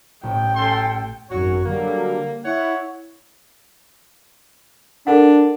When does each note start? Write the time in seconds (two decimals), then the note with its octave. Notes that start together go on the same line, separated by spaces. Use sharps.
0.23 A1 G5
0.56 C#4 A4 C6
1.30 G#1 F#2 F#4 C#5
1.65 D3 F#3 G3 A#3
2.45 E4 C#5 F#5
5.07 D4 A4 A#4 F#5